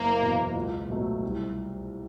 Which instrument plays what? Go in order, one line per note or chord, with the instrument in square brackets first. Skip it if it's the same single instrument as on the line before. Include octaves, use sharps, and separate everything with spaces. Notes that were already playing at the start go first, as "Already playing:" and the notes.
Already playing: [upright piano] F#1 [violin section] A#3 A#4
[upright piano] E2 B2
C#2
B2 F#3 A3
C2